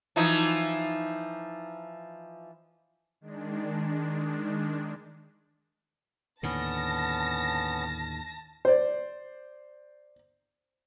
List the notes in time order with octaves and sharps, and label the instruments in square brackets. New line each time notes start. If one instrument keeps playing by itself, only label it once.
[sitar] E3 F3 D#4
[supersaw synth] D#3 G#3 D4
[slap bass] D#2 A2 D3 [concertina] B3 C#4 [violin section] A5 A#6
[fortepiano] C5 D5